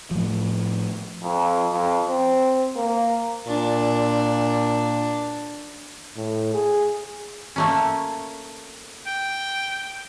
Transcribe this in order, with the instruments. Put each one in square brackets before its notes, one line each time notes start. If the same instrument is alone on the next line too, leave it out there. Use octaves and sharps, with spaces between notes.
[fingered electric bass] A2 F3
[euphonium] F2
F2
C4
A#3
[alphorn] A#2 [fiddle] D4
[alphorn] A2
G#4
[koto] A3 A#3 C#4
[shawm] G5